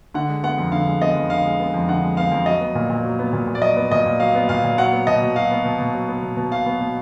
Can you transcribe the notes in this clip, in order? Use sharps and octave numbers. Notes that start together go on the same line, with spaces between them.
D3 F#5
G#3
B3 F#5
F2
D3 F5
G#3
B3 D#5
F2
D3 F5
G#3
B3
F2
D3 F#5
G#3
B3 F5
F2
F#3 D#5
B3
A#2
A#2
F#3
B3
A#2
A#2
D5
F#3 D#5
B3
A#2 D#5
A#2
F#3 F5
B3
A#2 F5
A#2
F#3 F#5
B3
B2 D#5
B2
F#3 F5
B3
B2
B2
F#3
B3
B2
B2
F#3 F5
B3
B2